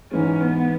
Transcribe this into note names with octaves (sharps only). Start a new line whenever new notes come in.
G#2 E3 G#3 C#4
B3